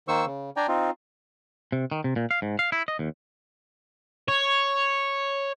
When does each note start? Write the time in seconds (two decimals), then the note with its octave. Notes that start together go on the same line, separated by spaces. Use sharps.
0.08 D#3 A#3 C5 C#6 E6
0.26 C#3
0.57 D4 D5 G5 G#5 A#5
0.68 C4 D#4 F4
1.72 C3
1.92 D#3
2.04 C3
2.16 A#2
2.31 F5
2.42 G#2
2.59 F5
2.72 E4
2.88 D#5
2.99 D#2
4.28 C#5